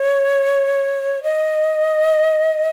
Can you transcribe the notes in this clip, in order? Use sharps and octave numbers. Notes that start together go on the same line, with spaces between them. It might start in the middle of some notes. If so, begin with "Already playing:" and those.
Already playing: C#5
D#5